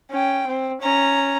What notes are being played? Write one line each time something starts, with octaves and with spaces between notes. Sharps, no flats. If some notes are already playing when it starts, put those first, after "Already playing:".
C#4 G5
C4
C#4 A#5